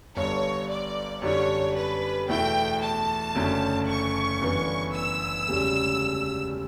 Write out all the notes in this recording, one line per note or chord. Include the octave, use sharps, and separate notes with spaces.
G1 G2 D3 C#5
D5
F#2 D3 G3 D4 C#5
B4
E2 B2 A3 E4 G5
A5
F#1 F#2 D3 A3 C#4
C#6
G1 F#2 E3 B3 D4
E6
E1 D2 C#3 G3 C#4